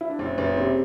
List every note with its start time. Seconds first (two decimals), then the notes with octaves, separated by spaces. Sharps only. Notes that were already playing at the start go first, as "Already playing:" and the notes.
0.01 E4
0.10 D4
0.19 F#1 C4
0.37 F#1 B3
0.56 C3 C4